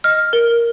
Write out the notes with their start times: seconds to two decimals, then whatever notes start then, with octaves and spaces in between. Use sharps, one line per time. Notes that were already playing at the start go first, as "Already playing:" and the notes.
0.04 D#5 F6
0.33 A#4